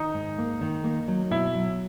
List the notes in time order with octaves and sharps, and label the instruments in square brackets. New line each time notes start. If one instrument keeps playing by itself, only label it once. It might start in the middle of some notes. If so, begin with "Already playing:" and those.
Already playing: [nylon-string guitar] D#3 [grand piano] D#4
[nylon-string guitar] G#2
A#3
D#3
A#3
F#3
[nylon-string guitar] B2 [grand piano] E4
[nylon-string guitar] F#3